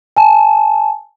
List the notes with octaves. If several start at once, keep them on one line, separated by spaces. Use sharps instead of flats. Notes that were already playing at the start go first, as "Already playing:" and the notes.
G#5 A5